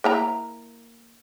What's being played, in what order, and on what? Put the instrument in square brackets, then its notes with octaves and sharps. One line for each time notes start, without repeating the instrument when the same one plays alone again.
[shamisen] A#3 E4 A#5